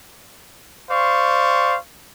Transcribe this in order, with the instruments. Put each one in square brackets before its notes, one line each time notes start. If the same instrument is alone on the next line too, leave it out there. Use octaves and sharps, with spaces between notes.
[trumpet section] C5 D5 F5 C#6